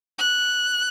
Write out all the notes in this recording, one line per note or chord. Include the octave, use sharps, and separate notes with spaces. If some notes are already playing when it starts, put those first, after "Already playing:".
F#6